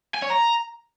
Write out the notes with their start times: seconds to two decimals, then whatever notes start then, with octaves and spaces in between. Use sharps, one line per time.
0.15 G#5
0.22 C#5
0.30 A#5